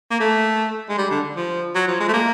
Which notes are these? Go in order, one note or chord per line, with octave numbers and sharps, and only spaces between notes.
A#3
A3
G#3
G3
D3
F3
F#3
F3
G#3
A3
A#3